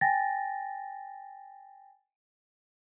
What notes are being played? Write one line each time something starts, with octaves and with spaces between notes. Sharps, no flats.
G5 G#5 A6 A#6